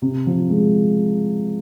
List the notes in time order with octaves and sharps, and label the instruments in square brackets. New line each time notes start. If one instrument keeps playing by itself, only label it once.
[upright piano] C3
F3
G#3